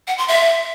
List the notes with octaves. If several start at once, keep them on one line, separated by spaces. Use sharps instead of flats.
F#5
C6
E5